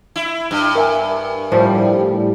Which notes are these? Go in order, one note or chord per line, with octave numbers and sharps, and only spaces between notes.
E4
G2
A#4 E5 G#5
A2 F3 G3